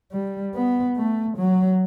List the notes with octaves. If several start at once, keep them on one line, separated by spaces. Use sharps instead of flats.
G3
B3
A3
F#3